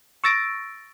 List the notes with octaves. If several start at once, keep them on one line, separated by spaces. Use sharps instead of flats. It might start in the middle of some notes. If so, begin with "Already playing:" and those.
C#6 E6 A6 A#6 D7